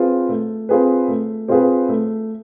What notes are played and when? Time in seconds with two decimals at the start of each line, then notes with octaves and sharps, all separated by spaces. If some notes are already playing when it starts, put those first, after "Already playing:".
Already playing: C4 F4 G#4 B4
0.29 A3
0.69 C4 F4 G#4 B4
1.08 A3
1.48 C4 F4 G#4 B4
1.89 A3